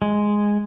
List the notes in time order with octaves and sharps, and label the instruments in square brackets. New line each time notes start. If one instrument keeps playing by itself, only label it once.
[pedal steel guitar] G#3